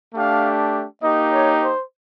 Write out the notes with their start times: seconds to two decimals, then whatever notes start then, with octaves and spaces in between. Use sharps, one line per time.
0.15 A3 D4 G4 F5
1.02 A#3 D#4 G4 D#5
1.32 C#5
1.61 C5